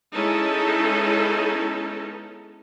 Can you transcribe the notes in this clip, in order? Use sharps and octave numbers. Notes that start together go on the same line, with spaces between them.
G#3 B3 C#4 D#4 E4 A4